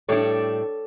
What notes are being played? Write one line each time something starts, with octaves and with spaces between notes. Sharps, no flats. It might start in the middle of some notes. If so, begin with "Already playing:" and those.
A2 G3 D4 A4 C#5